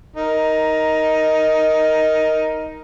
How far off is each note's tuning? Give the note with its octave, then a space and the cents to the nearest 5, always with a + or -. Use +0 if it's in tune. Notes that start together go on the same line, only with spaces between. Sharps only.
D#4 +10 A#4 +0